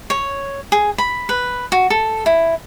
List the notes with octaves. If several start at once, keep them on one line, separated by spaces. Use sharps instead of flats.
C#5
G#4
B5
B4
F#4
A4
E4